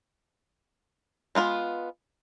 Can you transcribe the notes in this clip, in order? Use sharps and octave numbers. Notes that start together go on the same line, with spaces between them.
G#3 B3 F4 B4